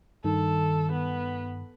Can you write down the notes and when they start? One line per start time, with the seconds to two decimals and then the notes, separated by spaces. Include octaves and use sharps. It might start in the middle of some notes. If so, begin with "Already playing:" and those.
0.24 G2 D#3 A4
0.92 B3